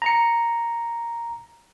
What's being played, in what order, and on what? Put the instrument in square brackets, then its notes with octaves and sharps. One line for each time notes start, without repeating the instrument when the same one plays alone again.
[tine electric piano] A#5 C#7